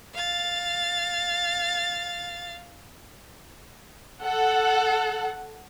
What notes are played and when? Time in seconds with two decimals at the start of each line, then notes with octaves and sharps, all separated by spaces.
0.14 F5 A6
4.22 A4 F#5